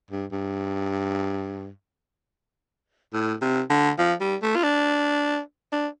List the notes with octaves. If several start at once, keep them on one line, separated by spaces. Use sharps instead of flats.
G2
G2
A2
C3
D3
F3
G3
A3
F4
D4
D4